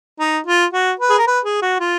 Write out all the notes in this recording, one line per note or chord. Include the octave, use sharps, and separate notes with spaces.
D#4
F4
F#4
B4
G#4
A#4
B4
G#4
F#4
F4